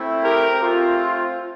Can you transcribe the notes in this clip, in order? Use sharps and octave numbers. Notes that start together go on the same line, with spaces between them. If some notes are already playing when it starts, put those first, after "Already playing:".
Already playing: A3 C4 E4
G4 A#4
A3 C4 F4